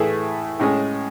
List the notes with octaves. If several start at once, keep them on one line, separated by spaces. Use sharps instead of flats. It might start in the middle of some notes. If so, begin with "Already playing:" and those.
Already playing: A2 E3 A3 E4 G#4
A2 G#3 C#4 G#4